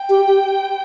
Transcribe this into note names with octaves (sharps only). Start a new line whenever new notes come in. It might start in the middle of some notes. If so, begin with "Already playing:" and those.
Already playing: G5
G4
G4